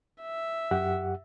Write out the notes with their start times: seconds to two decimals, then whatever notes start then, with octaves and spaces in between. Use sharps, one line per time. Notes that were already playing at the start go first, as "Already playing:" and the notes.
0.22 E5
0.71 F#2 G4 F#5